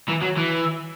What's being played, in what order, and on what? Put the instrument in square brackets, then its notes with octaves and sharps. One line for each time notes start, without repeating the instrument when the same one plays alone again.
[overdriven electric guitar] E3
F#3
E3